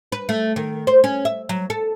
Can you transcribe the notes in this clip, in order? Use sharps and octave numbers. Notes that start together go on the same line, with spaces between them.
B4
A3
D#3
C5
C#4
E5
F#3
A4